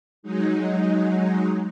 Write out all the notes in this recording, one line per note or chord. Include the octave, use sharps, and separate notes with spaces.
F#3 G#3 D#4